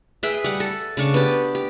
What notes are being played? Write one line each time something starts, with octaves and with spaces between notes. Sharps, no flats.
G#4 B4 E5 G5
G3 F#5
A4
C#3 D4 C#6
B3 G4
G4